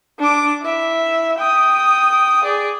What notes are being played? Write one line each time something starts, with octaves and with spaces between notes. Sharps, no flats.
D4 D6
E4 E5
G5 D#6
G#4 D5